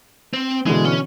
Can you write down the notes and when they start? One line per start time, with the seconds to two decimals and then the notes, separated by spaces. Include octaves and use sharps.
0.33 C4
0.66 B2 D3 E3 G#3
0.85 C#4